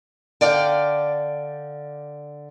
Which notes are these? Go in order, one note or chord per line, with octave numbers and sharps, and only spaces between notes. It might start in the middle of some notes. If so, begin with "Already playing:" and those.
D3 D5 F5 G5